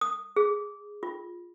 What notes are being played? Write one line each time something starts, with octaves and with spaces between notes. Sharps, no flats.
D#6
G#4
F4